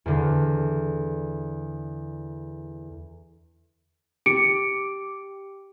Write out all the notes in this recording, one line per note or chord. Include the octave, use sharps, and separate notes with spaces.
E2 D3
G4 C#7 D7